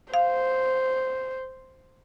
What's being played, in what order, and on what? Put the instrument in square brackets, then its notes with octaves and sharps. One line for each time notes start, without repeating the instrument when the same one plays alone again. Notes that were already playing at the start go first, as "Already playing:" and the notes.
[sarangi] C5 [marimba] F5